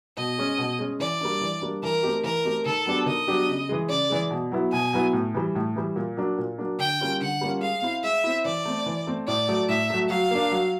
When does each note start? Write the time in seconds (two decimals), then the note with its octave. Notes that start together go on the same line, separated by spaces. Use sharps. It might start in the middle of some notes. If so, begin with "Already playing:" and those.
0.17 B2 D#5
0.38 G#3 C#4
0.58 B2
0.79 G#3 C#4
1.00 E3 D5
1.21 G3 A#3 D4
1.41 E3
1.62 G3 A#3 D4
1.83 E3 A#4
2.03 A3 C4 D#4 G4
2.24 E3 A#4
2.45 A3 C4 D#4 G4
2.66 D#3 A4
2.86 F#3 B3 D4 G4
3.06 D#3 D#5
3.28 F#3 B3 D4 G4
3.48 C#3
3.69 E3 G#3
3.89 C#3 D5
4.10 E3 G#3
4.31 B2
4.52 F#3 B3 E4
4.72 B2 G#5
4.93 F#3 B3 E4
5.13 A2
5.35 E3 G3
5.55 A2
5.76 E3 G3
5.96 A#2
6.17 F#3 A#3 D4
6.38 A#2
6.58 F#3 A#3 D4
6.79 D3 G5
7.00 G3 A#3 C#4 F4
7.21 D3 F#5
7.41 G3 A#3 C#4 F4
7.61 G#3 F5
7.82 C4 E4
8.03 G#3 E5
8.24 C4 E4
8.45 E3 D5
8.65 A3 C4
8.86 E3
9.07 A3 C4
9.28 A2 D5
9.48 F#3 A3
9.69 A2 E5
9.90 F#3 A3
10.10 F#3 F5
10.31 A#3 D4
10.51 F#3